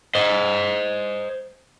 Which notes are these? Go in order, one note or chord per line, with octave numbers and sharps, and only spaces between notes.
C5 D#5